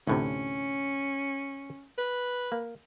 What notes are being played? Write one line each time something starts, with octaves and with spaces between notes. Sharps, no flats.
D2 A2 C3 C#4
B4
A#3